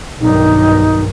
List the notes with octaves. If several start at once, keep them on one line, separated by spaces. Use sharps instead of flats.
B1 G2 D#3 D#4